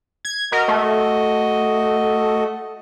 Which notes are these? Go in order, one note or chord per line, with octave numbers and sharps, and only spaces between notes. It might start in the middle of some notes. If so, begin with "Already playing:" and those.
G#6
F#4 A#4 D#5
A3